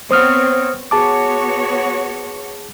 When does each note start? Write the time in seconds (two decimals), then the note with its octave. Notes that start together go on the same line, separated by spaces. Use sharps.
0.11 B3 C4 C5 C#5 D#6 F6
0.91 B3 F#4 G#4 C#5 A5 D6